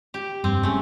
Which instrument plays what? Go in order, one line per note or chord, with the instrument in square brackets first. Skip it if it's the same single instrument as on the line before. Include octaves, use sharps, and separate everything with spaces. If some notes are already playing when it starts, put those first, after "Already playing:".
[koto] G4
[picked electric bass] F1 G2 [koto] C4
[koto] C#3 A3